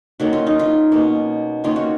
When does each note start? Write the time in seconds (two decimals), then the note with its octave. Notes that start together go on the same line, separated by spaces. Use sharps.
0.20 D#3 F#3 A#3 C#4 F#4
0.33 F4
0.47 D#4
0.59 F4
0.92 B2 A#3 C#4
1.64 D#3 A#3 C#4 F4
1.76 F#4